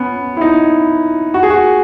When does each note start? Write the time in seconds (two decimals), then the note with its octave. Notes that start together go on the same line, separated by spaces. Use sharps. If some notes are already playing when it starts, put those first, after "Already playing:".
Already playing: B3 C#4
0.37 E4
0.41 D#4
1.34 F#4
1.43 G#4
1.50 F#4